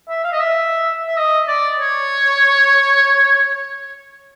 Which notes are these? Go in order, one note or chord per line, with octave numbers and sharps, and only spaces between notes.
E5
F5
D#5
E5
E5
D#5
D5
C#5